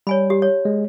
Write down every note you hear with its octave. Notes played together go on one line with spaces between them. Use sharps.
G3 C#5 G#5 B5
G4
C#5
G#3